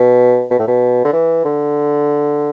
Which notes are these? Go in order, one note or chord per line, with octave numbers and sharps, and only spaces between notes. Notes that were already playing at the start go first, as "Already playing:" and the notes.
Already playing: B2
B2
A2
B2
D3
E3
D3